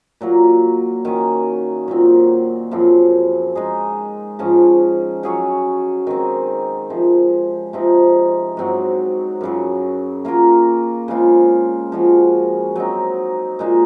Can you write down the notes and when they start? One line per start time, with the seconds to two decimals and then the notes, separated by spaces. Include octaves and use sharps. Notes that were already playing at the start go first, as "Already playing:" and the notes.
0.21 A#2 F#3 A#3
1.05 D#3 F#3 C#4
1.88 A#2 F#3 C4
2.71 F#2 C#3 F3 C4
3.55 G#3 D#4 G#4
4.39 G#2 F3 G#3 C#4
5.23 F#3 C#4 G#4 C#5
6.07 D#3 G#3 C4
6.90 C3 F3 G#3 C4
7.73 C3 F3 C4 D#4
8.57 G#2 F#3 C4 F#4
9.41 F#2 C#3 F#3
10.25 A#3 F4 A#4 C#5
11.08 C#3 G#3 C4 F4
11.92 F3 G#3 C#4 F#4
12.76 F#3 C4 D#4
13.59 A#2 G#3 D#4